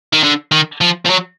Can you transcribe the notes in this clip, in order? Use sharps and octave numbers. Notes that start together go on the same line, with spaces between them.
D#3
D3
D#3
F3
F3
F#3